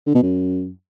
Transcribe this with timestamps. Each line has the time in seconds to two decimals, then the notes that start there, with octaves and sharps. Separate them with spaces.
0.07 D3
0.15 B2
0.23 F#2